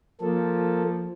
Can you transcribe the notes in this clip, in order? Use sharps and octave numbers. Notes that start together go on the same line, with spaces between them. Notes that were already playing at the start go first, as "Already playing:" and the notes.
F3 A#3 A4